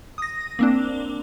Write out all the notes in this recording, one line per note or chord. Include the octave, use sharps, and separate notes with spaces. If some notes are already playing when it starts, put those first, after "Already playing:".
D#6 A#6
A#3 C4 D4